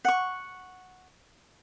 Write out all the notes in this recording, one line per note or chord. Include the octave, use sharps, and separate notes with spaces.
F#5 C#6